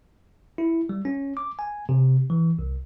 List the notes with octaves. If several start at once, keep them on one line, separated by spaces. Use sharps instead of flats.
E4
G3
C#4
D6
G#5
C3
E3
C2